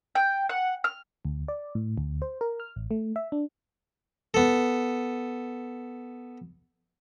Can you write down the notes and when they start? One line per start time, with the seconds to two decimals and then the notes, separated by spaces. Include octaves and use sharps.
0.15 G5
0.49 F#5
0.84 F6
1.25 D2
1.48 D5
1.75 A2
1.98 D2
2.22 C5
2.41 A#4
2.60 F6
2.76 A1
2.91 A3
3.16 E5
3.32 D4
4.34 B3 A4